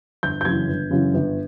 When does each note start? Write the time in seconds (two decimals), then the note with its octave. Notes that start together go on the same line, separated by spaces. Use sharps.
0.23 G1 G6
0.41 G6
0.45 F#2 C#3 E3 G#6
0.69 G1
0.91 F#2 C#3 E3
1.14 G1